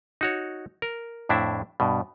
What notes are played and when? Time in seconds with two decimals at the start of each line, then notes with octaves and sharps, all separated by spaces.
0.21 D#4 F#4 C#5
0.82 A#4
1.29 F2 A2 D4 E4 E5
1.80 G2 B2